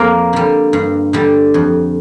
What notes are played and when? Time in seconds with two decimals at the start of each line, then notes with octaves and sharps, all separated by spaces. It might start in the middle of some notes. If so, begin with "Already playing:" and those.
Already playing: F2 A#3
0.33 D3 G3
0.73 G2
1.13 D3 G3
1.54 F2